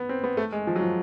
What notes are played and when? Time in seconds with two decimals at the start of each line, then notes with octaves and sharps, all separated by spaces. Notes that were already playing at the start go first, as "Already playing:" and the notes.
Already playing: B3
0.09 C4
0.24 B3
0.37 A3
0.52 G#3
0.67 F3
0.76 F#3
0.81 F3